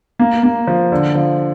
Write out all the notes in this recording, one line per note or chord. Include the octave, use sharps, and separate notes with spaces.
A#3
A#3
F3
D3
F3